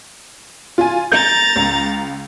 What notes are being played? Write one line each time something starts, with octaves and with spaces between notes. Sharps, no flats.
F4 G#5
A#5 G6 A6
C#2